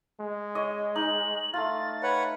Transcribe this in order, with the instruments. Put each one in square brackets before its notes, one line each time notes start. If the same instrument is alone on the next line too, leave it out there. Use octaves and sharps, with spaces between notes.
[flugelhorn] G#3
[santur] C#5 D#5
[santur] D#4 [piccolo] F#7
[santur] A3 F4 [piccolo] A6
[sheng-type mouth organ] B4 C#5 F#5